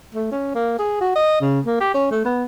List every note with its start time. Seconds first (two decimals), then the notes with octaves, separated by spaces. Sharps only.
0.15 A3
0.32 C#4
0.55 A#3
0.79 G#4
1.01 F#4
1.16 D#5
1.41 C#3
1.66 A#3
1.81 G4
1.94 C#4
2.11 A3
2.25 B3